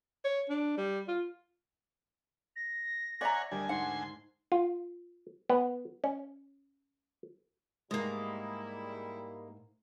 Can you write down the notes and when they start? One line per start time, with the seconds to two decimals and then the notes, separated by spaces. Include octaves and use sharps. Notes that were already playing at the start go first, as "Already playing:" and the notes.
0.25 C#5
0.49 D4
0.78 G3
1.08 F4
2.56 A#6
3.21 C#5 D5 E5 F#5 G#5 A#5
3.51 D2 G3 A#4 D#5 G#5
3.69 G#2 F#5 C6
4.52 F4
5.49 B3
6.04 C#4
7.91 G#2 G3 G#3 A#3 E4